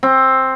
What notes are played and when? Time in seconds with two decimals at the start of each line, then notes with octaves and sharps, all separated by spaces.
0.03 C4